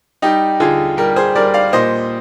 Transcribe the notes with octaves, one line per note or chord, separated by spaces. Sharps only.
G3 D#4 G4
D3 F4 G#4
G3 G4 A#4
G#4 C5
G3 A#4 D5
D5 F5
A#2 C5 D#5